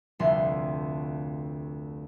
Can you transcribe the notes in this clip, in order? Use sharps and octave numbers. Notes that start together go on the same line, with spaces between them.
F1 D2 C6